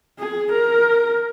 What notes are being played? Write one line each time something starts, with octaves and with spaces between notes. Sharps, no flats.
G#4
A#4